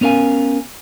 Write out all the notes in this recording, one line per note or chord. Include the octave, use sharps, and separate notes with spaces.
B3 C#4 A#4 F5 G#5